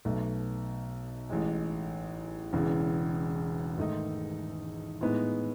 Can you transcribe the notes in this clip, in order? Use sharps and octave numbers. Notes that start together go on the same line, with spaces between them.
B1 B2 A3
A1 A2 G#3
E1 E2 C#3
G#2 D#3 A3 D#4
A2 G#3 B3 D#4